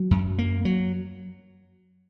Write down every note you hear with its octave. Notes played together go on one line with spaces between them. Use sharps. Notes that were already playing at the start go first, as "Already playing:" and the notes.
Already playing: F#3
F#2
A#3
F#3